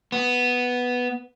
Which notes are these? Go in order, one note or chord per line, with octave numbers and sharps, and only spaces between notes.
B3